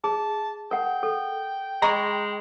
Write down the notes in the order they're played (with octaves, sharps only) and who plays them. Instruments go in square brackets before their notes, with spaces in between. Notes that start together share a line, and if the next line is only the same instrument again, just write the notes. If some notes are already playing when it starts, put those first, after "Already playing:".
[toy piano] G#4 [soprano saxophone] A5
[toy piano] A#4 F#5 [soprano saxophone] G5
[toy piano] A4
[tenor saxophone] G#3 [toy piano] D#5 B5 C#6 [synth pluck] A#5